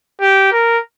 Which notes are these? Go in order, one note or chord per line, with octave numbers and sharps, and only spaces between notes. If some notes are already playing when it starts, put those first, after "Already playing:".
G4
A#4